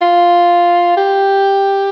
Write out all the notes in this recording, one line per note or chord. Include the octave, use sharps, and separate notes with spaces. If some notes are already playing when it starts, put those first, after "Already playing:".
F4
G4